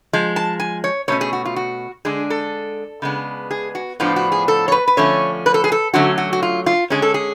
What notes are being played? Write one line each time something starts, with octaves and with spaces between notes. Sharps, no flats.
F3 G#3
A5
G#5
C#5
B2 A3 C#4 C#5
G#4
F#4
F4
F#4
D3 G#3 D4 G#4
A4
C#3 G#3 B3 D4
G#4
F#4
A2 F3 B3 D4 F4
F#4
G#4
A4
C#5
B4
B4
D3 F3 A3 C#4 C#5
B4
A4
G#4
A4
D3 F#3 A3 C#4 F#4
F#4
F#4
F4
F4
D3 G#3 C#4 G#4
A4
G#4